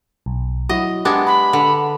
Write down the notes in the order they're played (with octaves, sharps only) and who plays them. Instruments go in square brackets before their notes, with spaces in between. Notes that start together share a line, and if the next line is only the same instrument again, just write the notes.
[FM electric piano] B1
[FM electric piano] F#3 E4 F#4 [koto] D#5
[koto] G#3 B3 D4 [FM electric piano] G4
[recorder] B5
[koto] D3